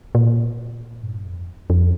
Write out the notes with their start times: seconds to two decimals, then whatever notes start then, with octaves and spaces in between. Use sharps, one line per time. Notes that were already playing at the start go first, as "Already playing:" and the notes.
0.15 A#2
1.03 G2
1.25 F2
1.70 F2